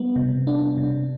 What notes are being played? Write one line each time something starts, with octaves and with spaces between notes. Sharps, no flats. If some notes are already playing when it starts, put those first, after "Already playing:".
Already playing: G3 B3
C3
D4
C3